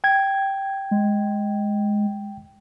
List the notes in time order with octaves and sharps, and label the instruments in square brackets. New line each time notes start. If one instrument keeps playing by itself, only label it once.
[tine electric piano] G5 G#6
[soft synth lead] G#3